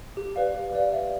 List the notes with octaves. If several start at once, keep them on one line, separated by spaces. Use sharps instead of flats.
G4
B4 D5 F5
G4
B4 D5 F5
E5